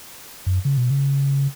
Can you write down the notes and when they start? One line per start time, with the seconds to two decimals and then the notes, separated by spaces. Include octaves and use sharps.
0.46 F#2
0.65 C#3
0.77 B2
0.90 C#3